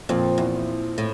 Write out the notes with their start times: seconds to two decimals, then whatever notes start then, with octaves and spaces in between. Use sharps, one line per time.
0.09 F2 A#2 F3 C4
0.38 E2
0.98 A2